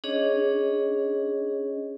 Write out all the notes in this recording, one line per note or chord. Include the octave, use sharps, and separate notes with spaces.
C#4 D4 G#4 C#5 D#5